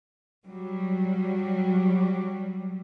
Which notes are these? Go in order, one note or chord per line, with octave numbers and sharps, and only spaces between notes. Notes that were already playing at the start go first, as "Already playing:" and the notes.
F#3 G3